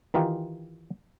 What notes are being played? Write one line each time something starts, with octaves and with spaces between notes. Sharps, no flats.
D#3 E3 D#4 F4 G4